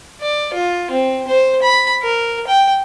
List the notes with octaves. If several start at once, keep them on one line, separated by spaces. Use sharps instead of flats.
D5
F4
C4
C5
B5
A#4
G5